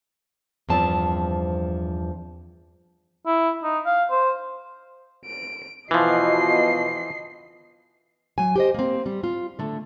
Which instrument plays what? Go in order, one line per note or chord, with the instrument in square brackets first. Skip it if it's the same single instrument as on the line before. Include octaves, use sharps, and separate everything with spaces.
[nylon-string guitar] E2 G2 F3 C4 A5
[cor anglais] E4
D#4
F5
C5
[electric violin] D7
[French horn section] B2 F4 [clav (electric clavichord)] E3 F3 [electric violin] D#5 C7
[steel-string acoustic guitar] F#3 G#5
G4 C5 D#5
A#3 C4
G3
F4
D3 A3